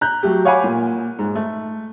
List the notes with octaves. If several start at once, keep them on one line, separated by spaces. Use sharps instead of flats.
A#5 F#6 G6
F#3 A3 G4
C#5 F5 F#5 G#5 B5 D6
A#2
G#2
A3